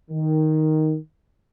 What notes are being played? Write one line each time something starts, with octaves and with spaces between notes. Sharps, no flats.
D#3